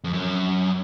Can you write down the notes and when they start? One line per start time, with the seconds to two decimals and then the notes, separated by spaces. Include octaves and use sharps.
0.04 F2
0.13 F#2